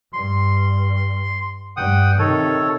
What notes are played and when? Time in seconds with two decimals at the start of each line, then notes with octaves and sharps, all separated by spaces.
0.13 G2 C6
1.77 G2 F#5 G5 D#6
2.19 C3 D#3 A4 C#5